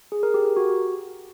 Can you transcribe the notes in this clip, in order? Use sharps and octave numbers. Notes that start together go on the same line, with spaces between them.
G#4
A#4
G4
A#4
F#4